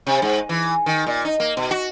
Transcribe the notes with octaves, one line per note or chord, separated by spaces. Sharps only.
C3
G#2
E3
D#3
A#2
D#4
A#3
B2
F#4